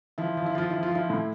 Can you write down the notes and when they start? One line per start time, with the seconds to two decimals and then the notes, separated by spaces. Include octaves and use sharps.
0.18 F3 E4
0.37 F3
0.46 E4
0.55 F3 F4
0.70 F3 E4
0.83 F4
0.91 F3 E4
1.10 A2